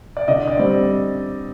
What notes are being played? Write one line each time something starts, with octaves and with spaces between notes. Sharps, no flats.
D5
D3 D#5
D5
G3 C4